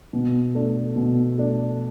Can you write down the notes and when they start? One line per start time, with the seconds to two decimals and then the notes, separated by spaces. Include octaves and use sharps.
0.13 B2
0.55 A3 D4
0.96 B2
1.38 A3 D4